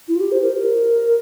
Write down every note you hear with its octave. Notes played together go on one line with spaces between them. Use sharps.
E4
F4
G4
C5
A#4